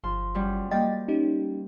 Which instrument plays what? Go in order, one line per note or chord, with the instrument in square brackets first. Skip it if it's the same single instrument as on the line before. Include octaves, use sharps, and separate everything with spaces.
[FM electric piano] G1 [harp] F3 C6
[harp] F#2 G3
[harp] G3 A#3 [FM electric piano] D#5 G5 A6
[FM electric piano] C#4 D#4 G4